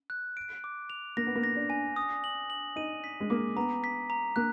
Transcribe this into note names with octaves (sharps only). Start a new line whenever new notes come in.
F#6
D7
D6
F7
A#3 A#6
B3
A#3
A#6
D4
G#5
D#6
F#7
F#7
D#4 D#7
B6
G#3
A#3 D6
B3 A#5
B6
A#5
A#3 F#6